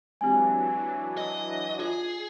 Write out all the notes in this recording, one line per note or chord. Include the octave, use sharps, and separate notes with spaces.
E3 F#3 G#3 C4 D4 G4 G#5
D#5
F4 G#4